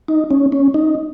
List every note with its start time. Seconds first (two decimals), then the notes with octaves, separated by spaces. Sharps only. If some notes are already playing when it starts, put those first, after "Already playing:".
0.08 D#4
0.31 C#4
0.52 C#4
0.74 D#4